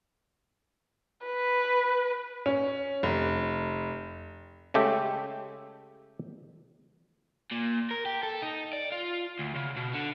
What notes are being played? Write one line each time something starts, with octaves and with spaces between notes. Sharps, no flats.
B4
C#4
F1
C#3 G#3 A3 G4 E5 G5
A#2
A#4
G4
A4
D#4
D5
F4
D2
C#3
B2
D3